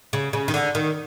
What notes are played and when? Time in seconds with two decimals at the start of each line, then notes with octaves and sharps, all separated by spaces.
0.13 C#3
0.33 C#3
0.48 D#3
0.54 D3
0.75 D#3